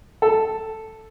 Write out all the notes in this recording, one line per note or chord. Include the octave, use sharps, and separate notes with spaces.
A4